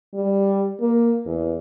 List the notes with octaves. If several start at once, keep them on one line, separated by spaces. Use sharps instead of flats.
G3
A#3
E2